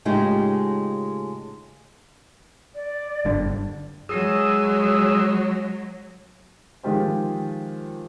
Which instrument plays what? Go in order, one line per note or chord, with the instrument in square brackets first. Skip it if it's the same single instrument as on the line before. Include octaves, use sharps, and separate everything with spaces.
[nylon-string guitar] A2 C#3 G#3 D#4 F4 G4
[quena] D5
[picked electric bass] F#1 G2 D3
[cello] F#3 G#3 [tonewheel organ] G#4 D#6 E6
[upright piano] D#3 F3 G#3 F4 G4 C5